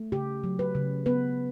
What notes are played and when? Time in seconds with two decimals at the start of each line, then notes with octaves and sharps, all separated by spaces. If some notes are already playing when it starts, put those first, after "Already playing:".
Already playing: A3
0.12 C#3 G4
0.44 F#3
0.59 B4
0.75 C#3
1.06 B3 B4